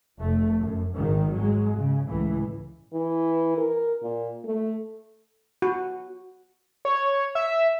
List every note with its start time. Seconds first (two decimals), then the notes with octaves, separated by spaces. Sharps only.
0.18 F1 A3
0.59 F#2
0.93 G#1 G#2 D#3
1.33 F#3 G#3
1.77 C#3
2.07 C#2 A2 E3
2.93 E3
3.58 A#4
4.03 A#2
4.45 A3
5.62 F#4
6.85 C#5
7.35 E5